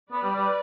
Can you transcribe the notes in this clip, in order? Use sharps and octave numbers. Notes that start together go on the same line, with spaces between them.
B3 B4 D5
G3
G3